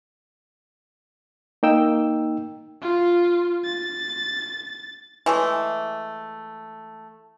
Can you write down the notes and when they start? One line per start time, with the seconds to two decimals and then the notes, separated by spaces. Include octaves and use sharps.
1.63 A#3 D#4 G5 E6
2.82 F4
3.65 A6
5.26 E3 G#3 A3